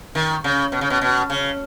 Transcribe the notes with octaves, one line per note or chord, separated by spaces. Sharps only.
D#3
C#3
B2
C#3
B2
B2
C#3